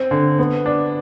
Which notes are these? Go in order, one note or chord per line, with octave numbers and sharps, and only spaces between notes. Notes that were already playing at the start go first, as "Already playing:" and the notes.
Already playing: C4
D3
B3
D4